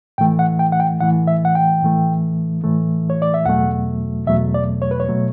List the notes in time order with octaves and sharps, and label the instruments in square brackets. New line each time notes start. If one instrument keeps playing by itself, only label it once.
[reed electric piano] A2 E3 A3 G5
F#5
G5
F#5
G5
A2 E3 A3 F#5
E5
F#5
G5
A2 E3 A3
A2 E3 A3
C#5
D5
E5
E2 B2 F#3 A3 F#5
E2 B2 F#3 A3 E5
D5
C#5
B4
C#5
B2 F#3 A3